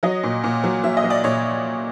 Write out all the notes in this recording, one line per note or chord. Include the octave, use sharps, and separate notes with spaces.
F#3 D#5
A#2
A#2
F#3
F#3 E5
D#5
F#3
D5
A#2 C#5